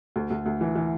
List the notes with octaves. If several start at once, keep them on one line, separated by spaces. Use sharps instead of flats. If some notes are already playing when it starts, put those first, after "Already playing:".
D2
D2
D2
E3
E3